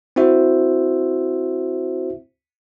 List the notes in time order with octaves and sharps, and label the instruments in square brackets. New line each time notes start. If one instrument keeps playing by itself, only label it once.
[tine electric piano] C4 E4 F#4 C5 E5